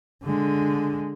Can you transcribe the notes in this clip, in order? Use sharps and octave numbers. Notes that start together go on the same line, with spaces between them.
D3 G#3